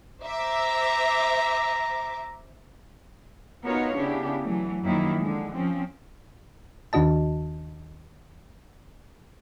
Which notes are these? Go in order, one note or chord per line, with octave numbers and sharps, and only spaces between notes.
C5 E5 A#5 D6
B3 D#4 F4 F#4 A#4 C#5
C#3 B3 D4 E4 G4
E3 F#3 A3
F#2 D#3 F3 F#3 A#3 E4
D3 G#3
F3 C4 C#4
D#2 D#3 D4 F#4 D#5 A5